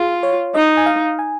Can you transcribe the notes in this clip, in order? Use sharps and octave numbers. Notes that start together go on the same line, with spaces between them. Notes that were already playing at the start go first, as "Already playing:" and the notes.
Already playing: F4 G#4
C#5
D#4 D#5
G#5
F5
G#5